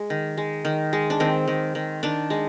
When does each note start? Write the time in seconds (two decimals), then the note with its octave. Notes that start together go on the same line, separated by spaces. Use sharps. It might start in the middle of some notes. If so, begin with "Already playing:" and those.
Already playing: G#3
0.10 D#3
0.37 G#3
0.65 D#3
0.93 G#3
1.10 D4
1.20 D#3 C4
1.48 D#3
1.75 D#3
2.03 D#3 D4
2.30 G#3